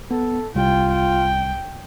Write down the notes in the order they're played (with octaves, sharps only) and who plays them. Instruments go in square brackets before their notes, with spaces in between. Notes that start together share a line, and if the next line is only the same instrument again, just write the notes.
[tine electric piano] B3 [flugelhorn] A4
[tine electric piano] C2 [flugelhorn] F4 [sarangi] G5
[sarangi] G5